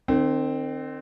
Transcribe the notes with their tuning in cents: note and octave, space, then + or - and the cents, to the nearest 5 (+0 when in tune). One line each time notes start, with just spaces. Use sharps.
D#3 -40 C4 +0